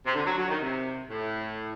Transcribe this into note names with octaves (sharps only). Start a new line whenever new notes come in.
C3
D3
F#3
F#3
D#3
C3
A2